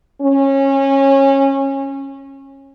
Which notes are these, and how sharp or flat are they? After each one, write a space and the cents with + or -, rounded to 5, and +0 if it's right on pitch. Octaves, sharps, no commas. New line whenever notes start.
C#4 -20